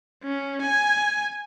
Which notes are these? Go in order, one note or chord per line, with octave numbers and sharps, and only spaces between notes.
C#4
G#5